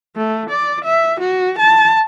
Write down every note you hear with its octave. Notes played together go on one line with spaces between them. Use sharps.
A3
D5
E5
F#4
A5